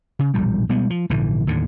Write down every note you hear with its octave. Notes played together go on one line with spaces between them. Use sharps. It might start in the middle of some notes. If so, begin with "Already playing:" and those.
C#3
E1 A#1 A2 G3
B2 G3 G#3 B3
F3
A#1 G#2 D3 E3
D#2 A2 D3